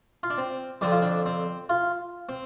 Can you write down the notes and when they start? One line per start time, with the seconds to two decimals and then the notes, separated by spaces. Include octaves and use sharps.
0.23 F4
0.30 D4
0.38 C4
0.81 F2 D3 F3 C4 D4
0.92 F4
1.02 D4
1.26 C4
1.69 F4
2.29 C4